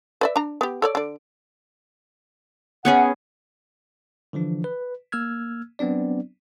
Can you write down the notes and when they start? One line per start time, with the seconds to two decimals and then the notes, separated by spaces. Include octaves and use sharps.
0.21 B4 D5 E5
0.36 D4 A#5
0.61 B3 G4
0.82 A4 C#5 D5
0.95 D3 D5
2.85 B3 C#4 G#4 F#5
4.33 D3 E3 F3 D4
4.64 B4
5.12 A#3 E6 F6 G#6
5.79 F#3 B3 C4 D4 D5